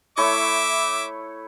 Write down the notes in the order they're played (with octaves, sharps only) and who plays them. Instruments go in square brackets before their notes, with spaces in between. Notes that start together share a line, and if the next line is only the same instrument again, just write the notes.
[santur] A3 E4 C#5 [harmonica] E5 D6